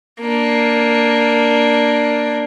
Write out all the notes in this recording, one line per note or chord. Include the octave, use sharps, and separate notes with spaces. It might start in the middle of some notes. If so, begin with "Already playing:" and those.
A#3 D4